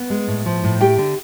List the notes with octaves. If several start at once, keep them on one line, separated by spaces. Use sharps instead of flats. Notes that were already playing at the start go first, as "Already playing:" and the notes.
Already playing: B3
G#3
A2
F3
A2
A3 G4 G5
D3